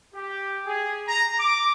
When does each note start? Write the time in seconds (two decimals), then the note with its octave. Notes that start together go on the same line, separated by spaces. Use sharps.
0.14 G4
0.66 G#4
1.07 A#5
1.40 D6